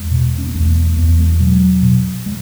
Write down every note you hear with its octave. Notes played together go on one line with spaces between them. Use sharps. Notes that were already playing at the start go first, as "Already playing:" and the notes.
Already playing: E2 G#3
B2
C#4
B3
E2 A3
B3
E2 B3
G#3
B2 F#3
B2
G#3